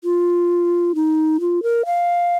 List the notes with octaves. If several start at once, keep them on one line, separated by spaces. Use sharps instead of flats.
F4
D#4
F4
A#4
F5